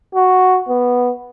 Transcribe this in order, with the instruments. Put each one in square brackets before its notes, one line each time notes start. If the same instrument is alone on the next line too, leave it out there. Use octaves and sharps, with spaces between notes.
[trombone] F#4
B3